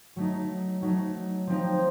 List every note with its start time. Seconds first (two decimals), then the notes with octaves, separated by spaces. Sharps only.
0.16 F#3 A3 D#4
0.82 F#3 A3 D#4
1.47 F3 C4 D#4